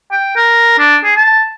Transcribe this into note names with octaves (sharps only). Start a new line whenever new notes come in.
G5
A#4
D4
G#4
A5